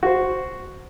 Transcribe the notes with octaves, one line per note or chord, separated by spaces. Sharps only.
F#4 C5